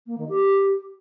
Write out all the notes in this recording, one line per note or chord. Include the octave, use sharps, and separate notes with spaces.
A#3
D#3
G4